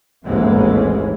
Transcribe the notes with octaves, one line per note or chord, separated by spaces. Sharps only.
A1 D#2 G#2 E3 G#3 C4